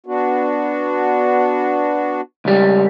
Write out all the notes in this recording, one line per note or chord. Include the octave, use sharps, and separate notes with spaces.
B3 D4 F#4
C#2 G3